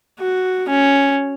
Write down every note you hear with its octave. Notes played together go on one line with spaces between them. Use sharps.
F#4
C#4